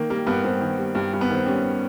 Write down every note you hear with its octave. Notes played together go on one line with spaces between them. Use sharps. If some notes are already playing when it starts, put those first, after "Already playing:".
Already playing: D#3 A#3
G3 A#3
G2 B3
G2 C4
D#3
G3
G2
G2
B3
D#3 C4
G3 C#4